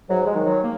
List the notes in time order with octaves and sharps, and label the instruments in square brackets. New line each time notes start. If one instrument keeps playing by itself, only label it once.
[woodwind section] G#2 F#3
G#3
D#3
F#3
A#3